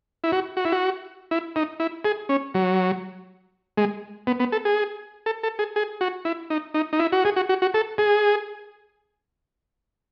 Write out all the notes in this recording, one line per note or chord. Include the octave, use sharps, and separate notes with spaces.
E4
F#4
F#4
E4
F#4
E4
D#4
E4
G#4
C#4
F#3
G#3
B3
B3
A4
G#4
A4
A4
G#4
G#4
F#4
E4
D#4
D#4
D#4
E4
F#4
G#4
F#4
F#4
F#4
A4
G#4